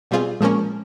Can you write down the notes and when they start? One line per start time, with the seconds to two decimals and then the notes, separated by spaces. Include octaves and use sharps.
0.11 B2 G3 C4 F4 G#4
0.41 A#2 F3 G#3 A#3 C#4